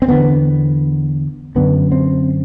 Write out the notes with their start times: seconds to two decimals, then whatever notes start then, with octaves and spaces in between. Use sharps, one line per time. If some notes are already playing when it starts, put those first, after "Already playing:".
0.02 C4
0.08 E2 D3 B3
1.56 F#2 D3 B3
1.92 C4